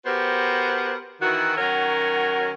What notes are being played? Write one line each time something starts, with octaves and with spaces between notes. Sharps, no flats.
B3 F#4 G4 A#4 C5
D#3 E3 F#4
D#3 F#3 C#4 F#4 A#4 C#5